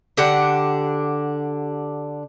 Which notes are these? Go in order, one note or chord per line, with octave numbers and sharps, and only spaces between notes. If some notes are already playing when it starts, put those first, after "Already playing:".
D3 D4 G4 F#5